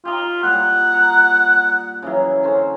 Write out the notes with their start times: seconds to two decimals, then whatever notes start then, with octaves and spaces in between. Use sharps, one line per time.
0.05 D#4 F4 G4
0.43 A#2 G3 F#5
0.94 A#5
2.02 C#3 E3 F#3
2.43 D3 C#4 C5